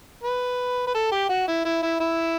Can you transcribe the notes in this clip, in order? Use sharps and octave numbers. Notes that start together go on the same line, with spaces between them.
B4
B4
A4
G4
F#4
E4
E4
E4
E4